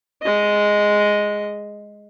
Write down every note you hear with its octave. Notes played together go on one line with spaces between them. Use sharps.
G#3 D#5